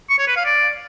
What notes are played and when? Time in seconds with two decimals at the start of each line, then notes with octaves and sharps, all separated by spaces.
0.10 C#6
0.19 C#5
0.28 B4
0.36 F5
0.45 D5